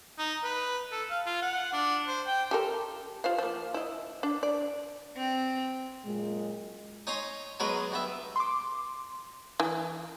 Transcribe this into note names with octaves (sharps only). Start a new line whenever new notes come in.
D#4
B4
A4
F5
F4
F#5
D4
C5
G5
G4 A4 A#4
F4 C5 F5
F3 A#3
E4 D#5
D4
D5
C4
F#2 A#2 G#3
D#4 C#5 D#5 G#5 A#5 C6
F#3 G#3 B3 A#4 B4 D#5
G2 B3 E5
C6 D6
E3